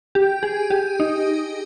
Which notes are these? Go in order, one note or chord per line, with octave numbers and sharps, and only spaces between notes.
G4
G#4
G4
D#4